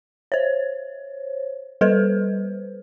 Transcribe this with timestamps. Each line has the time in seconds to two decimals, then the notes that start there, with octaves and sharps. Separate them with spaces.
0.32 C5 C#5
1.81 G3 A4 B4 C5